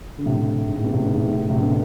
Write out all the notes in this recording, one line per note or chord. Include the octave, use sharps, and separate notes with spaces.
D3
A2 C3
G#2
A2
B2
A2 C3
G#2 B2
A2 C3
A2
A2 C3
B2 D3